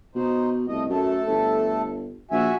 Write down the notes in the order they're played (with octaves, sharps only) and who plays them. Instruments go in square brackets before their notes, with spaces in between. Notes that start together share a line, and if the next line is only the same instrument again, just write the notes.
[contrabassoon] B2 [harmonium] D#4 C5
[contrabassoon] C2 [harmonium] A3 D#5
[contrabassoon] F#2 [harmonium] A3 A4
[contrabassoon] G1
[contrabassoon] A#1 [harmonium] F#4 E5 G#5